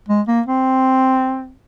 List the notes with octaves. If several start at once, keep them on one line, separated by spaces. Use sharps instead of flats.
G#3
A#3
C4